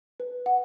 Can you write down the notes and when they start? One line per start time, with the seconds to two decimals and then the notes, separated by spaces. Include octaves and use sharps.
0.20 B4
0.46 F#5